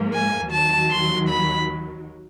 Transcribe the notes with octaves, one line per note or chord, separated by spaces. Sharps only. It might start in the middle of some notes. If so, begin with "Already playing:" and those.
Already playing: G#2 F3 A#3
G#5
D#2 D#3 F#3 A5
C6
B5